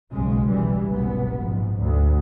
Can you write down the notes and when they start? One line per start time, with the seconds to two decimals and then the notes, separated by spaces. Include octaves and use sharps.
0.13 F#1 B1 C#3 G#3
0.47 B1 E3 G3
0.88 F#1 C2 G#2 B2 B3
1.38 A#1 G#2
1.77 D2